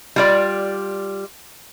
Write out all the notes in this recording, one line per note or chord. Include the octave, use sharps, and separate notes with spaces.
G3 F4 D5